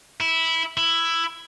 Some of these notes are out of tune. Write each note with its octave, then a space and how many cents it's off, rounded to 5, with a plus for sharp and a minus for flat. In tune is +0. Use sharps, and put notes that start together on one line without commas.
E4 -10
E4 +10